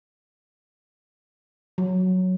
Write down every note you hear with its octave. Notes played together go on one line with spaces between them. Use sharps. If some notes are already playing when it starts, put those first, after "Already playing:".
F#3